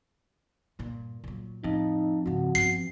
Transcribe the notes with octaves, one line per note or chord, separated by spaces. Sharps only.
G2 A#2
A#2 F#3
F2 A2 D#4
G#2 C#3 F#4
G2 B3 C7